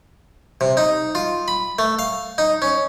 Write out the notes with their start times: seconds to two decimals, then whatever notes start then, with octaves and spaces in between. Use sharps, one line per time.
0.61 C3
0.77 D#4
1.15 F4
1.48 B5
1.79 A3
1.99 F5
2.38 D#4
2.62 C#4